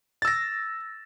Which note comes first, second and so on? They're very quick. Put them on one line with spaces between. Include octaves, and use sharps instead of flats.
A6 E6 A#6